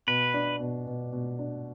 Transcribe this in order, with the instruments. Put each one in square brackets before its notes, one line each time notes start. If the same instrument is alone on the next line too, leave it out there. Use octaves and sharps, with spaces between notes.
[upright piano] B2 [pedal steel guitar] B4
[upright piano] D4
B2
B2
B2
D4